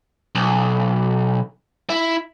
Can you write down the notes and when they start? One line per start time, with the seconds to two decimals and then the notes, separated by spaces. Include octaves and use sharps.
0.35 B1
1.90 E4